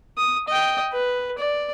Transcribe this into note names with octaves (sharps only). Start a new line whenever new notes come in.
D#6
D#5 G5
B4
D5